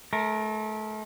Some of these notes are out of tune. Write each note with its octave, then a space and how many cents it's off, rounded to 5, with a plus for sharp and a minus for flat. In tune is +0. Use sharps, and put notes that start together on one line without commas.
A3 -30 A#4 +0